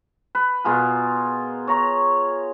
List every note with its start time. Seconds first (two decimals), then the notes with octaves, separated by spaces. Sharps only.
0.35 B4
0.65 B2 F4 G#4 A#4
1.67 C#5 A#5 C#6